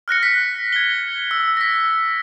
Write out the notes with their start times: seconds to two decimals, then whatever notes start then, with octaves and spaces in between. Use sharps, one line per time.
0.08 F6 F#6 A#6 C#7
0.23 B6
0.73 G#6 G7
1.31 E6
1.57 A#6 B6